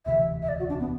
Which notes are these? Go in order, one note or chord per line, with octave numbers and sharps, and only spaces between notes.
E1 D2 C3 E3 E5
E5
D5
F#4
D4
B3